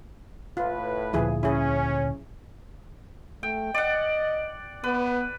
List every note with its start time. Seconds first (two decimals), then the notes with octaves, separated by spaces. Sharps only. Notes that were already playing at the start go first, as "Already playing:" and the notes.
0.57 A2 F4 B4
1.13 D2 A#2 F3 E4 G#4
1.43 C#4 E4 G#4
3.43 A3 G5
3.74 D5 D#5 F#5
4.84 B3 B4